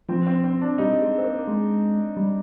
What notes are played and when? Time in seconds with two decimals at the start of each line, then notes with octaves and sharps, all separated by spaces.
0.09 F3 C4
0.27 C4
0.44 C4
0.61 D4
0.78 G3 D#4
1.02 G#3
1.18 C4
1.24 A#3
1.47 G#3
2.17 G3